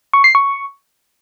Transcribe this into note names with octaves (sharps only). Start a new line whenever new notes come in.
C#6
C7
C#6